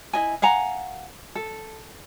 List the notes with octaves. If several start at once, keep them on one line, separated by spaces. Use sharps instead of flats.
E4 D#5 G#5
F5 F#5 G#5 A#5
A4